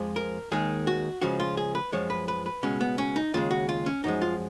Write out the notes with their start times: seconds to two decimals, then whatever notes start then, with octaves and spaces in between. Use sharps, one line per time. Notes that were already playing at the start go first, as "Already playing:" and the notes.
Already playing: F2 F3 G#3
0.16 A#4
0.51 D#2 D#3 G#3 G#4
0.87 F#4
1.22 C#2 C#3 F3 G#3 F#4
1.40 F4
1.57 G#4
1.75 B4
1.92 F#2 F3 G#3 C#5
2.10 B4
2.28 B4
2.46 B4
2.63 C#2 B2 G#3 C#4
2.81 B3
2.98 C#4
3.16 D#4
3.34 D#2 C#3 G#3 F4
3.51 F#4
3.69 F4
3.86 C#4
4.04 F#2 F3 G#3 D#4
4.22 F4